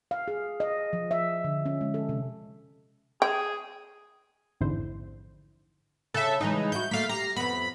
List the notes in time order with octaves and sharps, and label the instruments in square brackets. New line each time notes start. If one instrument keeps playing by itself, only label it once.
[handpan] F5
G#4
D#5
F3
E5
D3
C#4
G#3
A4
C3
[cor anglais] G#4 [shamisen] G5
[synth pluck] A1 F2 G#2 D3 E4 C5
[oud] C#3 [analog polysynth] A4 E5
[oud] C#3 E3 G#3 [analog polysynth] D#4
[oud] E4 F#4 [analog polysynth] G6
[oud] A3 A#3 [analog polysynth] F5 B6
[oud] G4 [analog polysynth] A#5 C7
[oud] F2 B3 [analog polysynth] B5